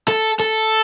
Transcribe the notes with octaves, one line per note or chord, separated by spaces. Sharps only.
A4
A4